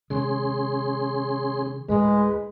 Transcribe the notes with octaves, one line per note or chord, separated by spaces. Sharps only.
C3 D#3 G#3 C#4 G#4 C6
D2 A2 G#3 B4